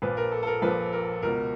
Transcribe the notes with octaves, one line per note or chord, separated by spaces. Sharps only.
A#1 A#2 F3 B4
A#4
A4
A4
A#4
A#1 A#2 F3 B4
A#4
C#2 B2 A#4